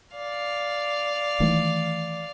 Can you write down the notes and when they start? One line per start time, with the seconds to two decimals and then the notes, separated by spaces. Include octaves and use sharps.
0.15 D5 F5
1.40 D#3 E3 A3